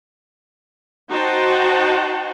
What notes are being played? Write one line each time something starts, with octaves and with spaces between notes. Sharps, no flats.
D#4 F#4 C5 F#5 G5 A5